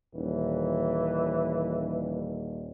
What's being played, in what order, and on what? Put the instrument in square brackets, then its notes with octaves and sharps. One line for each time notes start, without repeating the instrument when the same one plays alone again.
[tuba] D#1 [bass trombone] E3